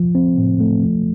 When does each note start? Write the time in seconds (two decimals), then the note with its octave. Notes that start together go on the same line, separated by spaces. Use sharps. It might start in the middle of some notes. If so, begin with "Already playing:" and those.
Already playing: F3
0.15 C4
0.38 A2
0.60 A3
0.83 F3